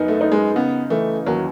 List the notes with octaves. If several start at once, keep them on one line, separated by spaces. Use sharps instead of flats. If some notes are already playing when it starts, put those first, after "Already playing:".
Already playing: F#2 B3 D#4
A3
D#4
G#3
C#3 B3
E3 A3
D#2 F#3